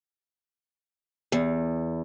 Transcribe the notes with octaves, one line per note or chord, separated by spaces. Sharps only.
E2